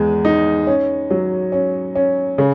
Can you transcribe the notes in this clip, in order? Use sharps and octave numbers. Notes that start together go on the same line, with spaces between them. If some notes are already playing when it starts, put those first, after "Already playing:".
Already playing: E2 G#3
D#4
C#4
F#3
C#4
C#4
C#3